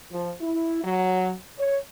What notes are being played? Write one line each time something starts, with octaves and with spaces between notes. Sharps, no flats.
F3
E4
F#3
C#5